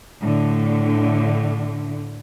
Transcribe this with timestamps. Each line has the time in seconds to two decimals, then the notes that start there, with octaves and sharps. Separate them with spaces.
0.21 A2 D3